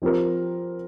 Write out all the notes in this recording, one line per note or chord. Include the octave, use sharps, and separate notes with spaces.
F3 C4 G4 A#4